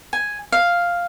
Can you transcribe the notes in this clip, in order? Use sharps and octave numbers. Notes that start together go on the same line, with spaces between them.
G#5
F5